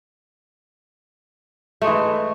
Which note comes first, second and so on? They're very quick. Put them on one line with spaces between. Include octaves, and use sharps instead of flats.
A3 G#3 E3